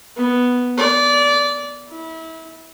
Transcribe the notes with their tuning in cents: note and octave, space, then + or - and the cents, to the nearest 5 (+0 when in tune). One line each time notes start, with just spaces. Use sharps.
B3 +0
D5 -20
E4 -30